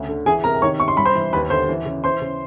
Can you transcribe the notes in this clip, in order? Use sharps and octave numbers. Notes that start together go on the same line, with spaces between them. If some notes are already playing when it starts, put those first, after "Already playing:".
Already playing: D2 C#3
D3
E3 G#4 G#5
C3 A#4 A#5
D#3 C#5 C#6
C3 C#6
C6
G2 B5
C5 C6
E3
D#2 B4 B5
D3 C5 C6
E3
C#3
E3 C5 C6
C#3